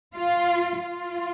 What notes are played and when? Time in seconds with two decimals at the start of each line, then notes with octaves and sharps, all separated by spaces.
0.15 F4
0.83 F4